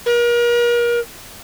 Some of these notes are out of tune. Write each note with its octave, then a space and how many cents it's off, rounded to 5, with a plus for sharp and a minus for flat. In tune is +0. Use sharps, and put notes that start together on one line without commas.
A#4 +35